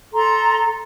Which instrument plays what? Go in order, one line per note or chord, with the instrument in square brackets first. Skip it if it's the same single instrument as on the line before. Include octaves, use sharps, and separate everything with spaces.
[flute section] A4 A#5 C6